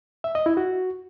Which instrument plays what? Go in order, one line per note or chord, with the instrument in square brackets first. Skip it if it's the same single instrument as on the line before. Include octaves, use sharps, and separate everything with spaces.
[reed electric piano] E5
D#5
E4
F#4